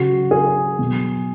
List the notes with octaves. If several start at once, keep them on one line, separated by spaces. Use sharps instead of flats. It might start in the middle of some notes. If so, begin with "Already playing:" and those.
Already playing: C#3 F#3 F#4
G#4
B2 F#3